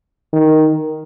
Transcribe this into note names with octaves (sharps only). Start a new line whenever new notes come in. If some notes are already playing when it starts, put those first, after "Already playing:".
D#3